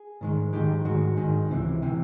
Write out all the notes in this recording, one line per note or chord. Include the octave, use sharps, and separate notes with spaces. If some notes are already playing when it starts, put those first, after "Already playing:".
Already playing: G#4
G#2 D#3 G#3
G#2 D#3 G#3 G4
G#2 D#3 G#3 F#4
G#2 D#3 G#3
C#2 C3 E3
C3 E3